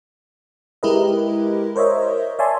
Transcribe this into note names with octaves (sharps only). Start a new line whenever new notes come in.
G#3 E4 G4 A#4 B4 D#5
A#4 C5 C#5 D#5 E5
C#5 D5 E5 G#5 A5 C6